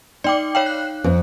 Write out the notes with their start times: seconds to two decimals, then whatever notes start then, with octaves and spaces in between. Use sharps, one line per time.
0.24 D#4 D5 G5 D6
0.55 C#5 F5 G5
0.66 F#6
1.04 F2